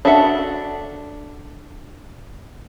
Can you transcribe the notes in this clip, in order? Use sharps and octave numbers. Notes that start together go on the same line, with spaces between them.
D4 F#4 A4 E5 F#5